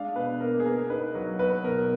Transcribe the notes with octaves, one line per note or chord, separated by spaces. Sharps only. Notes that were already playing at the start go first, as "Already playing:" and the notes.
Already playing: G#3 D4 F5
B2 B4
A#3 A#4
G#4
B3 A#4
D#4 B4
F#3
B3 B4
B2 A#4